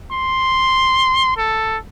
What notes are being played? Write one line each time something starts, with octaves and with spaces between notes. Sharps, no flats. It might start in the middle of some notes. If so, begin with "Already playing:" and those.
C6
A4